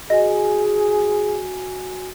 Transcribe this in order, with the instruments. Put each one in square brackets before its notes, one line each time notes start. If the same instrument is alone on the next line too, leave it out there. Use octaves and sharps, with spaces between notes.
[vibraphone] F#4 G#5 [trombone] G#4 [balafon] D#5